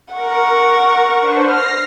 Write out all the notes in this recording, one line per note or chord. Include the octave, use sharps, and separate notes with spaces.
A#4 F#5 C#6
D4 B4 C5
F6 A#6 C7